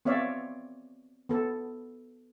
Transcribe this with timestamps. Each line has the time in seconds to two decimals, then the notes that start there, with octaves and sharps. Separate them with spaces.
0.05 B3 C4 C#5 D5 E5 F5
1.29 B3 A4